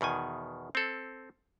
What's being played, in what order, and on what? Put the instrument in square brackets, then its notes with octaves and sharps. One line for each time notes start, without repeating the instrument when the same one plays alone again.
[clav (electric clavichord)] E2 B2 D#3 G#5
C4 A4